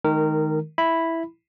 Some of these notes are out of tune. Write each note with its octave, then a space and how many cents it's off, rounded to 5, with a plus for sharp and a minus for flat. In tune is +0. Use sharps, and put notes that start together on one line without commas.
D#3 +0 G#3 +45 A#4 -20
E4 +0 B5 +0